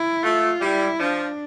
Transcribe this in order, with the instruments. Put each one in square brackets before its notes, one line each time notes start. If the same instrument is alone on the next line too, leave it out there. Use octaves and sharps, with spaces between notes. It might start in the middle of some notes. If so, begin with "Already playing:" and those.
Already playing: [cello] E4
[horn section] A3 [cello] F4
[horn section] G3 [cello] E4
[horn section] F3 [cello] D4